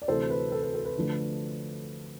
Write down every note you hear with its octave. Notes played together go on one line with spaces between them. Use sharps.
D5
D2 C3 E3 A4 C5
B4
A4
B4
A4
B4
D3 F3 A3